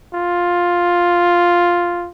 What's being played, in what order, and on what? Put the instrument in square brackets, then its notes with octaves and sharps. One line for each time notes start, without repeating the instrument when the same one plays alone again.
[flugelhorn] F4